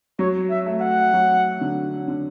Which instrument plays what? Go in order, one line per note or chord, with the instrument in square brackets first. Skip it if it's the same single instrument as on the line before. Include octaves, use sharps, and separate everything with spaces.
[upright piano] F#3 [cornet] C#5
[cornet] E5
[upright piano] A3
[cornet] F#5
[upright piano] F#3
D3
D3